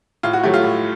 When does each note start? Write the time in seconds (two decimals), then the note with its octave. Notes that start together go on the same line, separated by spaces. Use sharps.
0.23 A2 F4
0.33 F#4
0.43 F#3 A3 G4
0.54 F4
0.63 A2